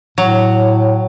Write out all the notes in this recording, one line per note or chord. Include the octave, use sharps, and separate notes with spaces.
A2 F#3